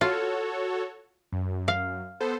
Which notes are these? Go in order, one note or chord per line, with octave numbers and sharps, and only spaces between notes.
F4 F#4 A4 C#5
F#2
F5
B3 A4 C5